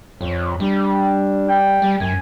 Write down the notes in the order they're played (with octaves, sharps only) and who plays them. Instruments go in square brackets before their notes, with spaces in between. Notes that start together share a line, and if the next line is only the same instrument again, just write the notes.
[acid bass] F2 [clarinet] C#5
[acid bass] G3 [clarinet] D4
[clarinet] G5
[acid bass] G3
[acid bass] F#2 [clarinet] G#5